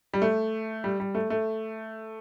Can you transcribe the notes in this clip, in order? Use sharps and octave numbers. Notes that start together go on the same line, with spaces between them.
G3
A3
G3
G3
A3
A3